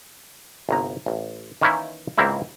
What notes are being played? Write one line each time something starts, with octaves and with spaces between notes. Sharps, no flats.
G1 C2 A#5
A1
D#3 E3 A#3 C#4 D#4 E4
C#2 G#2 A#3 C4 E4